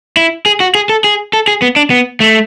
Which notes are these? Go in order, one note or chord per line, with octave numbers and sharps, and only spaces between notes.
E4
G#4
F#4
G#4
A4
G#4
A4
G#4
B3
D4
B3
A3